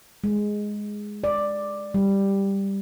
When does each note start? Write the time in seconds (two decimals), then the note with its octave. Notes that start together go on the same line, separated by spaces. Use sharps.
0.24 G#3
1.24 D5
1.94 G3